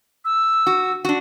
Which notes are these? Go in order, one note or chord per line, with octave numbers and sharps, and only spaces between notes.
E6
F#4
D4 F#4